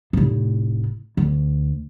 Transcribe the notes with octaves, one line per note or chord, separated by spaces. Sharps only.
F1 A2
D2